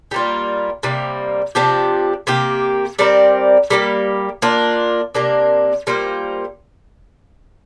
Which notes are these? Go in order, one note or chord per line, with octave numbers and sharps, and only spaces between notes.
G3 A#3 F4
C3 G3 A#3
C3 F3 D4 G4
C3 A#3 G4
G3 C4 A#4 D5
G3 A#3 G4
A#3 D4 F4
C3 A#3 D4
G3 A#3 F4 C5